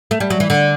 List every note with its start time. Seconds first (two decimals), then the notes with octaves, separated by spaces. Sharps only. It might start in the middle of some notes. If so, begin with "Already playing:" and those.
0.11 A3
0.20 G3
0.30 F#3
0.40 E3
0.50 D3